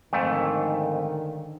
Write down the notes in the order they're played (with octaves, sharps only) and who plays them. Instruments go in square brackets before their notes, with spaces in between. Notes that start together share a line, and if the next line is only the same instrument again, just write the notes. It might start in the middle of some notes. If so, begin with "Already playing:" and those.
[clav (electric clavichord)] F2 G#2 A3 [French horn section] D3 D#3